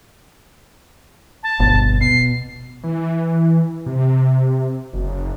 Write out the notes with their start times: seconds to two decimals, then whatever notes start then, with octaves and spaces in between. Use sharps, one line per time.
1.43 A5
1.59 D1 G1 B2
2.01 B2 C7
2.84 E3
3.86 C3
4.94 F#1